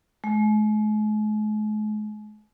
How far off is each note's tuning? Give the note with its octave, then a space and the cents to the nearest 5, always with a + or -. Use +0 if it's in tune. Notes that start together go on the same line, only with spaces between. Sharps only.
G#3 +45